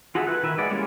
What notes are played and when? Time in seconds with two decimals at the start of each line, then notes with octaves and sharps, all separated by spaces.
0.15 F4 F#4 G#4 A4 E5
0.27 E4 B4 F#6
0.43 D#3 B4 E5
0.58 G#3 B3 D5
0.70 G3 G#3 A#3 C#4 E4